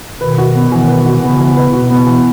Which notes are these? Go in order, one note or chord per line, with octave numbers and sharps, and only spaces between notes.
B2 D#3 B4
F#4
B3
B2 D#3 E3
B4
F#4
C#3 B3
E3
B4
B2 F#4
B3
E3